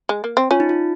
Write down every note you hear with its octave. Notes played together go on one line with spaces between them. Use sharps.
G#3
A#3
C4
C#4 F4
D#4
F4